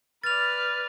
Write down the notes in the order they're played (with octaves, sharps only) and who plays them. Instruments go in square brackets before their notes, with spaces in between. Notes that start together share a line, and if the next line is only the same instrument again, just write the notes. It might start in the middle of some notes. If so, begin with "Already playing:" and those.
[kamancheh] B4 D5 [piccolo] F6 [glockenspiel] A6 F7